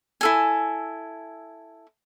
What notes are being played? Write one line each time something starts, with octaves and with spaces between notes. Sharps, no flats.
E4 A4 G#5